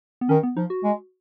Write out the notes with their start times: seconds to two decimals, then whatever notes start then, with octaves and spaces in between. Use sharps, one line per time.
0.21 B3
0.29 D#3 C#4
0.43 B3
0.57 F3 D#4
0.70 F#4
0.84 G#3